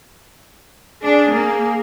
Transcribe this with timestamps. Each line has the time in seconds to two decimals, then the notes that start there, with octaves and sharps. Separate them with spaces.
1.03 D4 G#4
1.33 A#3